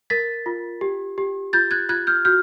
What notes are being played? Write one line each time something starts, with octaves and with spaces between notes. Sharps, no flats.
A#4 A6 B6
F4
G4
G4
F4 G6 A6
F#6 G#6
F4 F#6 G#6
F6 G6
F#4 F6 G6